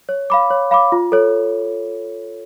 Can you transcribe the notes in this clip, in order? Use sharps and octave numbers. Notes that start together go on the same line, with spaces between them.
C#5
F5 B5 D6
C#5
F5 B5 D6
F4
A4 C#5